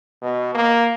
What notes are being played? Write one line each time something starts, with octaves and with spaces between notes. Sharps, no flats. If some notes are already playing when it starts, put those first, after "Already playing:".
B2
A#3